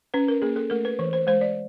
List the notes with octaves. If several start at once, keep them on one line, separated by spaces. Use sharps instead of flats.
C#4 B4
A#4
A#3 G#4
A4
A3 A#4
B4
E3 C5
C5
G#3 C5
D5